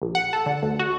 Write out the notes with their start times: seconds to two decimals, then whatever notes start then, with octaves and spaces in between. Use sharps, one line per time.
0.02 A#1
0.15 F#5
0.33 A4
0.46 D3
0.63 D2
0.79 F#4